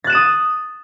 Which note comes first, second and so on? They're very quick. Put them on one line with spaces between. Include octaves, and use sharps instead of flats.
A6 F#6 E7 D#7 D#6